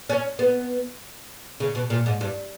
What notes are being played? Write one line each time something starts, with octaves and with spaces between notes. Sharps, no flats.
C#4
B3
C#3
B2
A#2
G#2
G2